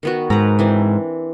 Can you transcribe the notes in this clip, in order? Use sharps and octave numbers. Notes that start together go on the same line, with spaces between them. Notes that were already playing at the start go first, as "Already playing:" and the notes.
D#3 B3 F#4
G#2 B4 A#5
E3 C4 D4